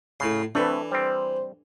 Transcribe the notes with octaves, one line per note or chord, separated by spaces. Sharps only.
A2 C#3 C6
E3 A3 C4 D4 A4 B4
G3 C4 C5